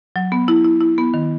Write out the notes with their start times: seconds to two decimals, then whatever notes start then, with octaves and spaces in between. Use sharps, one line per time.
0.16 F#3
0.32 B3
0.48 E4
0.65 E4
0.81 E4
0.98 B3
1.14 D#3